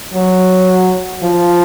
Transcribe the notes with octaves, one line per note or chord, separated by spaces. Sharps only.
F#3
F3